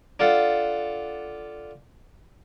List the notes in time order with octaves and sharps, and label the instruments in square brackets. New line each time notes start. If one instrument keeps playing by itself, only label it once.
[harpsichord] D4 F4 A4 F5 F#5